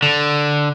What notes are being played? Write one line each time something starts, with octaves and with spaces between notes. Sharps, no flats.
D3